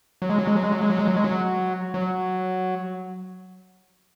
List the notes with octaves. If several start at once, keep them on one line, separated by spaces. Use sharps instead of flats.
F#3
G#3
F#3
G#3
F#3
G#3
F#3
G#3
F#3
G#3
F#3
G#3
F#3
F#3